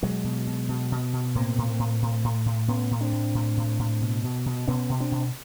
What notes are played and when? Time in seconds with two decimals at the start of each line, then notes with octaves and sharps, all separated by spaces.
0.02 B2 F#3 G#3
0.24 B2
0.47 B2
0.69 B2
0.92 B2
1.13 B2
1.35 A2 A#3 C4
1.58 A2
1.79 A2
2.02 A2
2.24 A2
2.46 A2
2.68 A2 B3 C#4
2.91 A2
3.01 C4 D4
3.12 A2
3.35 A2
3.57 A2
3.79 A2
4.01 B2
4.24 B2
4.46 B2
4.68 B2 B3 C#4
4.89 B2
5.00 C4 D4
5.12 B2